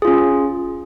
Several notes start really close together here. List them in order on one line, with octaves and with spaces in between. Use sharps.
G#4 F4 C#4